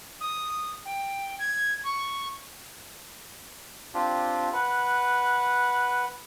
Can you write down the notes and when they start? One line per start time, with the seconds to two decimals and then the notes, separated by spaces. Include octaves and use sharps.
0.21 D#6
0.85 G5
1.39 G#6
1.84 C#6
3.94 C4 D4 F4 G4
4.53 B4 F#5